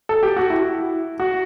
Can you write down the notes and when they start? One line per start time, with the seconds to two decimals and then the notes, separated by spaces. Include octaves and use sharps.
0.09 A4
0.23 G4
0.37 F#4
0.50 E4
1.20 F#4